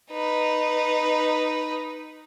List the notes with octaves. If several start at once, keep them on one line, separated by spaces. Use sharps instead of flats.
D#4 B4